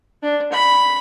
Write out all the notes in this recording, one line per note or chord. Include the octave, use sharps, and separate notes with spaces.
D4
B5